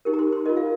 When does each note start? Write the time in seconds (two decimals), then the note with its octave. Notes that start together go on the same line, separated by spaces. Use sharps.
0.05 D#4 G4 A#4
0.14 A#5
0.19 C6
0.32 C6
0.46 F4 A#4 D#5
0.57 F5